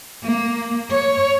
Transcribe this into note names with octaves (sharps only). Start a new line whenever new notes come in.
A#3
C#5